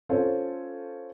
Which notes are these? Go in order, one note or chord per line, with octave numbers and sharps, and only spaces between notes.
C#4 F4 A4 C5 C#5